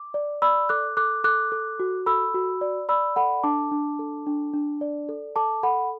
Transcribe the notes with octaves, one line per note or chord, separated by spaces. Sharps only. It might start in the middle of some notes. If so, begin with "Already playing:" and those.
Already playing: D6
D5
D5 B5 E6
A4 D6 F#6
A4 D6 F#6
A4 D6 F#6
A4
F#4
A4 B5 E6
F#4
D5
D5 B5 E6
A4 F#5 B5
D4 A5 D6
D4
A4
D4
D4
D5
A4
A4 A5 D6
A4 F#5 B5